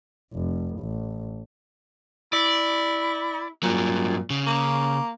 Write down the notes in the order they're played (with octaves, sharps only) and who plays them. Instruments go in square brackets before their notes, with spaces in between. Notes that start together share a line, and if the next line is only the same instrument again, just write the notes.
[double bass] F1
A1
[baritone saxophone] E4 [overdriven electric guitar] D5
[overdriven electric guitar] G2 F#3 [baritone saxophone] A#2
[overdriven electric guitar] C#3
[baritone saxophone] A#3